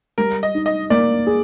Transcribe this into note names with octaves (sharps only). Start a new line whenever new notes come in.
G3 A#4
D#5
D#4
D#5
A#3 D5
G#4